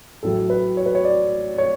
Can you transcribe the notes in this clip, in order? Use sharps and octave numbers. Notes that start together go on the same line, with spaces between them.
A1 A2 F#3 A4
B4
C#5
B4
C#5
D5
C#5